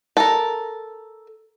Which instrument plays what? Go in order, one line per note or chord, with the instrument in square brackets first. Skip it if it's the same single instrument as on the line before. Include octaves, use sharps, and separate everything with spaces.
[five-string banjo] A4 A#4